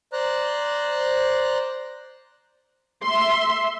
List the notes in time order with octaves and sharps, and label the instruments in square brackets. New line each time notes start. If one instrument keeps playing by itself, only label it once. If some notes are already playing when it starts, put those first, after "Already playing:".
[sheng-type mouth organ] C5 D5 A#5 F#6
[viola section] E5 C6